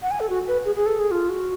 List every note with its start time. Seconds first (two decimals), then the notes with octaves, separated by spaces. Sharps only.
0.02 F#5
0.11 G#5
0.20 A4
0.29 F#4
0.48 B4
0.65 G#4
0.75 G#4
0.86 A4
0.99 G#4
1.11 F4
1.29 F#4